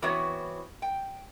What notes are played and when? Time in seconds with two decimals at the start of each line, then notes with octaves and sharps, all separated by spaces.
0.02 E3 B3 C4 E4 F#4 C#5
0.82 G5